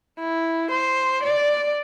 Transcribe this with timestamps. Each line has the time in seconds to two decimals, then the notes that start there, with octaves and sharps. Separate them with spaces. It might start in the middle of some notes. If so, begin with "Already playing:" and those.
0.19 E4
0.71 C5
1.23 D5